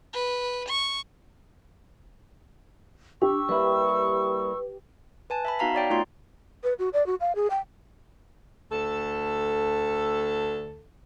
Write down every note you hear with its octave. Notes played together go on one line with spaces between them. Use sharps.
B4
C#6
D4 G4 C#6 E6
G3 A#3 E4 B4
B4 G#5 A5
E5 A5 B5
B3 D#4 F#4 F5 A#5 B6
C#5 D5 G5
A3 D#4 F4 A#5 C6
B4
F#4
D5
F#4
F5
G#4
G5
D2 A4